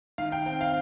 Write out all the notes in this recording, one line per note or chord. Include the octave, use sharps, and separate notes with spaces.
D#3 F5
G5
C4 G5
F5